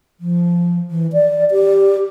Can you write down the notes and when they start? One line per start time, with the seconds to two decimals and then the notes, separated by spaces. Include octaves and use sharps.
0.20 F3
0.91 E3
1.13 D5
1.51 G4